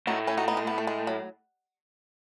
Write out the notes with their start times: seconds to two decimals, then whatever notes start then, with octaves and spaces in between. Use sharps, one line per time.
0.07 A2 D#4 F#4
0.27 C#4 E4
0.37 D#4 F#4
0.48 B3 D#4
0.57 G#3
0.67 B3
0.78 A3
0.87 G#3
1.07 F#3